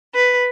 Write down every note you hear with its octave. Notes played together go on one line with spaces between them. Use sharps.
B4